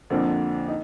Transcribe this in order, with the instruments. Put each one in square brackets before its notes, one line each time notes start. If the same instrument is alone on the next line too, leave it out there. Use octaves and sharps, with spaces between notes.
[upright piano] F2 D3 F3 A#3 D4
D#4